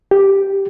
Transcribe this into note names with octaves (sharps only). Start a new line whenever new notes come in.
G4